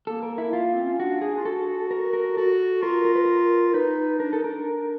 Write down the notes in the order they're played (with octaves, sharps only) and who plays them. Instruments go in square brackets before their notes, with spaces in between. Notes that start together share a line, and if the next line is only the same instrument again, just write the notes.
[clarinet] A#3 [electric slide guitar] A4
[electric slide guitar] A#4
E4
F4
[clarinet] C4
C#4
[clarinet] D4 [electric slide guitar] F#4
[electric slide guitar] G#4
[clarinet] F4
[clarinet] F#4 [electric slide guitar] A4
[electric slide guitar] A#4
A#4
[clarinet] F#4 [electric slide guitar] A4
[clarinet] F4 [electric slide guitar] A#4
[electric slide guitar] A#4
B4
A#4
[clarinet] D#4 [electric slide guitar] B4
[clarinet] D4 [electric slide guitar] A#4
[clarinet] D#4 [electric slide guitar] A4
[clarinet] D4 [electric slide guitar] A#4